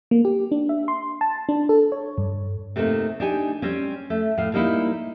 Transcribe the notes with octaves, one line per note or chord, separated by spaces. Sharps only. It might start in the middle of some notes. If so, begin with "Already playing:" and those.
A#3
G4
D4
E5
C6
A5
D4
A4
C#5
G2
C3 A3 A#3 C4 D#4
D4 D#4 G4 G#5
G3 C4 C#4
A3
A2 F5
G3 A#3 D#4 E4